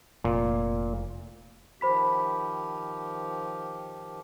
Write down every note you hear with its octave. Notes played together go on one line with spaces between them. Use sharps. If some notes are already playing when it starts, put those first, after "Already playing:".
F1 A#2
D#3 F3 G4 C5 B5 B6